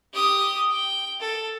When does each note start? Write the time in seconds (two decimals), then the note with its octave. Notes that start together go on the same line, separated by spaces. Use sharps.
0.13 G4 D#6
0.70 G5
1.20 A4